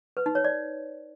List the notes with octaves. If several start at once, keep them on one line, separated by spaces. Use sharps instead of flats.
B4
D#4
C#5
D5